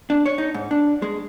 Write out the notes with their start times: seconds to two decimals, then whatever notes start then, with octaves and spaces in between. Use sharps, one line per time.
0.10 D4
0.26 C#5
0.38 D#4
0.54 G#2
0.71 D4
1.02 G#3